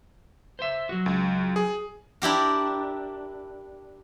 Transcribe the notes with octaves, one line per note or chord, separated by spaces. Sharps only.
C5 E5
F#3 F#4
C#2
G#4
D4 E4 G4 A#4